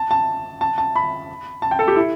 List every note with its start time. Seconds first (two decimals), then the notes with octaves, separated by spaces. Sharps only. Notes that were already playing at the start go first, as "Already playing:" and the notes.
Already playing: A5
0.11 A5
0.61 A5
0.78 A5
0.96 B5
1.62 A5
1.71 G5
1.79 A4
1.88 G4
1.96 E4